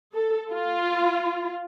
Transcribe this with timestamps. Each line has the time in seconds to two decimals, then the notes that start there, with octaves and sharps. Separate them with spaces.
0.14 A4
0.51 F4